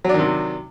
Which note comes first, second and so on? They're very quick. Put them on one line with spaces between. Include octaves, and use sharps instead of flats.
F#3 D4 D#3 C3